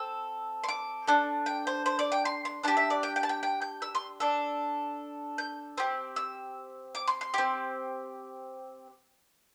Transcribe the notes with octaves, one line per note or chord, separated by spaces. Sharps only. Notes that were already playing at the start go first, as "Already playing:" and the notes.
Already playing: C4 A4 E6
C6
D6
D4 A4
G5
C5
C5
D5
G5
C6
C6
D4 G4 A5
E5
D5
G5
G5
A5
G5
G5
G6
E6
C6
D4 A4 E6
G6
C4 G4
E6
D6
C6
C6
C4 G4